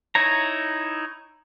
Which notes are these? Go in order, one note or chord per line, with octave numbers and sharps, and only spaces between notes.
D#4 E4 C#5 A#5